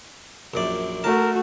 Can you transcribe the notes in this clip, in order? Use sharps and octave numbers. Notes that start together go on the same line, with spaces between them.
A#1 F#2 D5
A3 F#4 A#4 A5